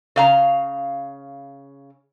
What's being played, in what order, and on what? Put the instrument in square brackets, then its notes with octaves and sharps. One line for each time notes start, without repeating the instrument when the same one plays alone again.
[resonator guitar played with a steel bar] C#3 F5 A#5